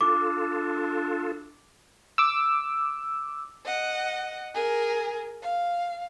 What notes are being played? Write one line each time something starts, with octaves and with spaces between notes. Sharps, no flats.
D4 F4 A4 D6
D6 E6
D#5 F#5
G#4 A#4
F5